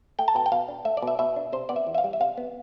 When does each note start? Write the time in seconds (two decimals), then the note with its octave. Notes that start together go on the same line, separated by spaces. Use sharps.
0.19 A3 G5
0.28 A5
0.35 B2 G5
0.46 G5
0.52 B2 F5
0.68 D4
0.85 A3 E5
0.97 D5
1.02 B2 E5
1.19 B2 E5
1.36 D4
1.53 C3 C5
1.69 B3 D5
1.76 E5
1.87 E2
1.94 E5
1.98 F5
2.04 G3
2.13 E5
2.20 C3 F5
2.38 B3